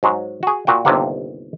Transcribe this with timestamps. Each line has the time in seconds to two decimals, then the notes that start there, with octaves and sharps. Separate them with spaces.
0.03 G#2 F#3 G#3
0.43 F#4 G#4
0.67 A#2 F#4 G5
0.85 G1 D#2 C3 A#3 F#5